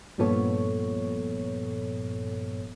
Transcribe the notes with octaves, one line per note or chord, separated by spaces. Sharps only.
G2 A#2 F3 B3 A4 C#5